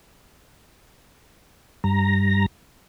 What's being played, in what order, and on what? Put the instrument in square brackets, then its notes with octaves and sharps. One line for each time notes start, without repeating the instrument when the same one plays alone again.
[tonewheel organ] G2 A#5